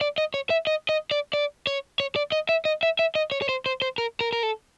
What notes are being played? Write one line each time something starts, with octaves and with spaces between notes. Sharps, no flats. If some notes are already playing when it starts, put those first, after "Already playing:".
D5
D#5
C#5
E5
D#5
D#5
D5
D5
C#5
C#5
D5
D#5
E5
D#5
E5
E5
D#5
C#5
C#5
C5
C5
C5
A#4
A#4
A#4
A4